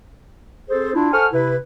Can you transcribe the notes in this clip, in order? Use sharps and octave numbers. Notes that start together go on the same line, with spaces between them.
C4 G#4 A4 C5
D4 E4 F4
A4 C5 F#5 G#5 C#6 F6
C3 E4 B4